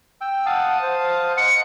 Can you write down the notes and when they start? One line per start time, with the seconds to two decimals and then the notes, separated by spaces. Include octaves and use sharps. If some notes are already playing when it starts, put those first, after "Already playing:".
0.21 G5 E6
0.46 F5 F#5 A5 D#6
0.82 C5
1.37 D#5 F#5 C6 C#7